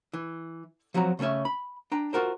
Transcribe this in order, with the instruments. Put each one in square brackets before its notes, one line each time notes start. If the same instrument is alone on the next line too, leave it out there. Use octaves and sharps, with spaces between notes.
[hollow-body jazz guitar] E3
F3 F#3 C4 F#4 A#5
C#3 A3 C4 C#4 E5
B5
D4 G5 A#5
F4 F#4 A#4 C5